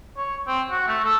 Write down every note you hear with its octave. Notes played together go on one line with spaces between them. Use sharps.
C#5
C4
F#4
A3
A4